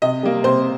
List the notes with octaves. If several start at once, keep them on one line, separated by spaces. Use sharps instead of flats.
C3 D#5
G3 A#3
C3 C5